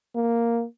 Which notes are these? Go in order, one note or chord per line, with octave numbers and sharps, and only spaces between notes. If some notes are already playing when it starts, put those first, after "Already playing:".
A#3